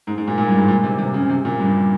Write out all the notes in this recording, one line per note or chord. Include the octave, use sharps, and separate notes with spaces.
G#2
G#2
A#2
A#2
G2
G#2
A#2
C3
C3
C#3
C3
A#2
G2